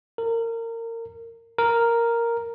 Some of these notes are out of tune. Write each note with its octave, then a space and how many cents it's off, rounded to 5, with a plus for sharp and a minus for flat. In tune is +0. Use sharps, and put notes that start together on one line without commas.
A#4 -25
A#4 +0